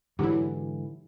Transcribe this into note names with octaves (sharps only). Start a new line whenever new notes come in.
G#2 D3 E3 F#3 E4 G4